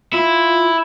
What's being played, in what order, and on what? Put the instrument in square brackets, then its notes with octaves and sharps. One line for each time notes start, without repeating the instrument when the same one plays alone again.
[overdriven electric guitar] E4 [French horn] F4